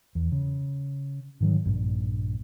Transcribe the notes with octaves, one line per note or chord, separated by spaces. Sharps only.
E2
C#3
G#2 D#3 F#3
A#1 G2 A#2